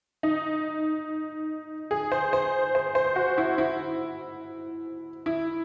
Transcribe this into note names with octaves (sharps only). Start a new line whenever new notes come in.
D#4
G#4
C5
C5
C5
C5
F#4
E4
E4
E4